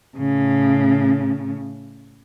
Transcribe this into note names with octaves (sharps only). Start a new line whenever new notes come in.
A2 C#3